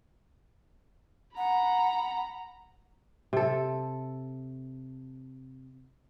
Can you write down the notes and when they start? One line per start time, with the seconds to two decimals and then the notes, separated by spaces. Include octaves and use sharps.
1.37 F#5 A#5 B5
3.33 C3 A4